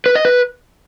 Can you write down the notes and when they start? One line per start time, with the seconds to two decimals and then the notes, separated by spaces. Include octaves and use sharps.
0.06 B4
0.15 D#5
0.25 B4